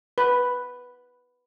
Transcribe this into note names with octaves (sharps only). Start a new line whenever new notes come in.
B4